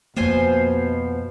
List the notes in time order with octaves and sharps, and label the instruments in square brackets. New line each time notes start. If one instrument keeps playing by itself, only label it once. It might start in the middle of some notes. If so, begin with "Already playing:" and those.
[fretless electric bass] F2 A#3 [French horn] B2 [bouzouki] F3 C5 G#5